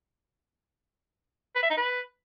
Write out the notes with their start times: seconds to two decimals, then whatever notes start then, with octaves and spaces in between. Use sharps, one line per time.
1.56 B4
1.63 E5
1.70 D#4
1.77 B4